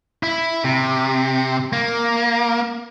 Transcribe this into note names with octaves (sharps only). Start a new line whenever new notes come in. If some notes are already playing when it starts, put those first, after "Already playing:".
E4
C3
A#3